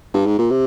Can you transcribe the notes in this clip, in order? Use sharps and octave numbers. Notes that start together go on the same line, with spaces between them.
G2
G#2
A#2
C3